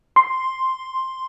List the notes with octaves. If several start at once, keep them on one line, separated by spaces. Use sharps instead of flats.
C6